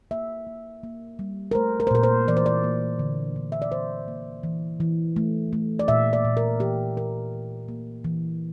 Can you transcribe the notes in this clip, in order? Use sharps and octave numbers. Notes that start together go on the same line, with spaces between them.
A#3 E5
A#3
A#3
G3
A#4
A3 C5
A#4
C5
A#2 A#4
C5
E3 D5
C5
D5
A#3
D3
D3
E5
D5
E3 C5
A#3
E3
E3
A3
A3
D5
A#2 E5
D5
A#2
A#4
E3 G4
E3 A#4
E3
A#3
E3